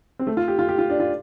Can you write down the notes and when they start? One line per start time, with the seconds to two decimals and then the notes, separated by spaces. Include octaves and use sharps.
0.19 C4
0.27 A3
0.37 F4
0.48 G4
0.59 F4
0.69 G4
0.79 F4
0.90 D4
1.00 F4